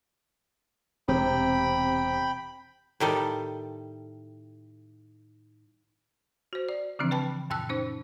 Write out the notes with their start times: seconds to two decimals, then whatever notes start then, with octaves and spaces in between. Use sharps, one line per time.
1.08 E1 C3 G5 B5
3.00 A2 D#3 G3 A4
6.53 F#4 C5
6.69 D5
6.99 C#3 E3 F3 C4 D4
7.11 B4 G5 A5 B5
7.50 F#2 A#2 G5 A5 E6 F#6
7.69 C#4 D#4 C5